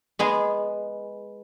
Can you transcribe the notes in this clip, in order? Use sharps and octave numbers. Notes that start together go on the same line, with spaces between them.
G#3 B3 G#4